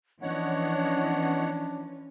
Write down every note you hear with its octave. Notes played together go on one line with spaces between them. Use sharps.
E3 F3 B3 C#4 D4 C#5 D#5 F#5